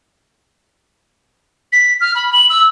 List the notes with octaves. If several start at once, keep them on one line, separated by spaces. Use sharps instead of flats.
B6
F6
B5
F#7
E6